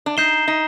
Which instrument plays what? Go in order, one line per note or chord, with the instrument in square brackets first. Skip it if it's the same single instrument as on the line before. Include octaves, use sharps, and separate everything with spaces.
[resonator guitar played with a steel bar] D4
[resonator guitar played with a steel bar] D#4 [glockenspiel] G6 C7 E7 G7
[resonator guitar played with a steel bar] D#4